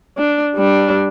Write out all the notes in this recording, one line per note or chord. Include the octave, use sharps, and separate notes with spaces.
D4
G3 D4